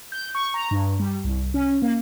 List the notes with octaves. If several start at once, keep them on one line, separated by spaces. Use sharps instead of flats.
G6
C#6
A#5
G2
G3
C2
C#4
A#3